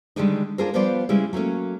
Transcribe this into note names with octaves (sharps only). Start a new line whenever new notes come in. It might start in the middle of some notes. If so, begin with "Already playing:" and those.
D3 D#3 G3 G#3 D4 D#4
D4 F4 G#4 A#4 C5
F3 G3 B3 F4 C5 D5
C#3 G3 G#3 E4
F#3 A3 A#3 C#4